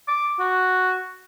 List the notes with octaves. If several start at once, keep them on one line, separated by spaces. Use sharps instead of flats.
D6
F#4